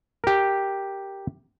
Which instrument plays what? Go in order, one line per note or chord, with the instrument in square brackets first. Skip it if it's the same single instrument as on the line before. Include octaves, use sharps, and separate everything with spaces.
[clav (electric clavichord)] G4 A#4